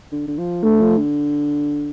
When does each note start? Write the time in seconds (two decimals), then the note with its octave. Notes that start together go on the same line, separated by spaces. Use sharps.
0.12 D3
0.27 D3
0.38 F3
0.63 D3 A3
0.80 F3
0.97 D3